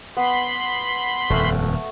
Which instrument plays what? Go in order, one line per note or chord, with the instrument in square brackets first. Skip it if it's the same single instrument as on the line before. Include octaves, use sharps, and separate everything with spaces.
[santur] B3 [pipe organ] B5 C6
[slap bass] D#1 F2 [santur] A3